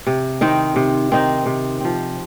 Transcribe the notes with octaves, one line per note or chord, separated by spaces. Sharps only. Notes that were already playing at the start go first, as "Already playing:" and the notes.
C3
D#3 C4 D#4
C3
D#3 C4 D#4
C3
F3 C4